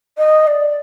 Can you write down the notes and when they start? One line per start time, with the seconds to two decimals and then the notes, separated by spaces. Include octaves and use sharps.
0.18 D#5
0.47 D5